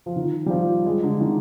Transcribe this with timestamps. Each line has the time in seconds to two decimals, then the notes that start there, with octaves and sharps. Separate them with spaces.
0.06 F3
0.16 D#3
0.46 G3
0.50 F3
0.86 G#3
1.03 D3
1.20 D#3